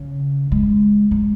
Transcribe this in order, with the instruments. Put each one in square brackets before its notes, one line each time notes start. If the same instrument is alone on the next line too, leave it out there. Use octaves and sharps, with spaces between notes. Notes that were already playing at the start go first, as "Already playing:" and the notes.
Already playing: [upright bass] C#3
G#3
G#3